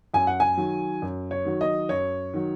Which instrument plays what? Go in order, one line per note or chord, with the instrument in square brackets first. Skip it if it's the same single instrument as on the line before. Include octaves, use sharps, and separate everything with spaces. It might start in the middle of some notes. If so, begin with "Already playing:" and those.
[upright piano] F#2 G#5
F#5
G#5
D#3 F#3
F#2
C#5
D#3 F#3
D#5
F#2 C#5
D#3 F#3